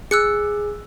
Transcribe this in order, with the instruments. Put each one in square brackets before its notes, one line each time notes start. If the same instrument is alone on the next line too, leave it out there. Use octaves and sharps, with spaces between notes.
[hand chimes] G#4 [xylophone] E6 F#6 C#7